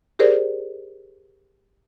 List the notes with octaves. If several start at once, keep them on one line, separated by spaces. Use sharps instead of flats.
G4 G#4 A#4 C5 D5